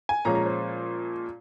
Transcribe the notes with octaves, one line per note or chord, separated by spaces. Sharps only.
G#5
A#2 F3 G#3 C#4 A#5
A#5
C5